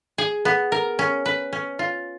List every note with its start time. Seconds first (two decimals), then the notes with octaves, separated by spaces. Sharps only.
0.18 G#4
0.45 B3
0.72 A#4
0.99 C#4
1.26 B4
1.53 C#4
1.79 F4